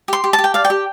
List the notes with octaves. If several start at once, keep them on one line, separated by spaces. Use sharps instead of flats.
G4 C6
G4
A5
G4
G5
D5 F5
G5
G4